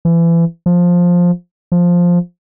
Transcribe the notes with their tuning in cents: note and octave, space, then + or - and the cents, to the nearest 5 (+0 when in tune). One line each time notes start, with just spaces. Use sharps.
E3 +30
F3 +10
F3 +5